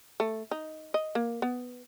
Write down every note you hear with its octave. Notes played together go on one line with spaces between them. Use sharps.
A3
D#4
D#5
A#3
B3